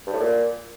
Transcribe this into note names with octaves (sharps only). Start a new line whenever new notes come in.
G2
A2
A#2